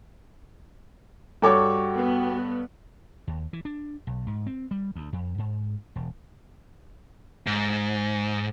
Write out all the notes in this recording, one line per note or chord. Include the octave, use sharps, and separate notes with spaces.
G2 F#4 G4 A4 C#5
B3
D#2
E3
D4
B1
G#2
C4
G3
D2
F2
G#2
E1
G#2